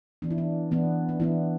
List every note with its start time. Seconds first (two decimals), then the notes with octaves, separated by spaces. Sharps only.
0.22 E3 B3 D4
0.31 E4
0.38 D4
0.71 E3 B3 D4
1.09 D4
1.20 E3 B3 D4 E4